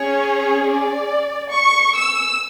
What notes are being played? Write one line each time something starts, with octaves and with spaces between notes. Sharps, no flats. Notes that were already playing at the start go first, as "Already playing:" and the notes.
Already playing: C#4 G#4 C#5
D5
C#6
E6